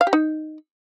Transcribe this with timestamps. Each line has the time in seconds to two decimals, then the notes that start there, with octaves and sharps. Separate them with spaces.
0.01 F5
0.07 G4
0.13 D#4